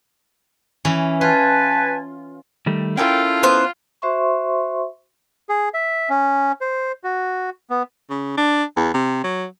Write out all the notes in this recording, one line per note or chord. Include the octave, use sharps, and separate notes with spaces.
E3 C#4
F4 B4 G#5 A5
D#3 G3 A3
C#4 E4 F4 A4 A#4 G5
B3 C5
F#4 C5 E5 C6 C#6
G#4
E5
C#4
C5
F#4
B3
C#3
D4
E2
C3
F#3